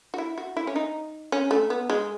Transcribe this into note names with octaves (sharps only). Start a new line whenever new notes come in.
F#4
E4
F#4
E4
C#4
D#4
C#4
A3
B3
G#3